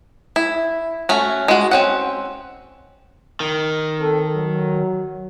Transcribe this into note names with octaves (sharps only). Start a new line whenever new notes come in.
E4
A3 C#4 F#4
G#3 F#4
C4 C#4 F#5
D#3
C4 A4
F#3